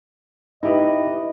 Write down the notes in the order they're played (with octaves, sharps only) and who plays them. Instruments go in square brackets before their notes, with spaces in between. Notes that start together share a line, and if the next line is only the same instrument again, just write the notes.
[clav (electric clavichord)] D#4 G4 B4 [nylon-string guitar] E4 [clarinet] D#5